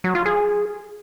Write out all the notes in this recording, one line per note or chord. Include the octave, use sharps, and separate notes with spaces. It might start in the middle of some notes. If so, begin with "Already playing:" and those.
F#3
F4
G#4